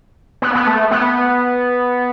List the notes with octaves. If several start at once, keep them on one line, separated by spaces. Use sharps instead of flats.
B3
B3
A3
B3